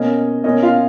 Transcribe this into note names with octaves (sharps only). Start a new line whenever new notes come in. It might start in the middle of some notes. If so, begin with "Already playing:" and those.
Already playing: B2 A#3 C#4 D#5
B2 A#3 C#4 D#5
F4 F5